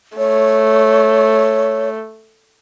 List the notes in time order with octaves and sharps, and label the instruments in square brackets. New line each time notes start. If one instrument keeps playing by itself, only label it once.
[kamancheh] A3 [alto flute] C#5